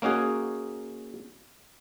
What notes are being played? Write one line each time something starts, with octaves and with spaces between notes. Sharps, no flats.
A#3 C#4 D#4 F#4 G#4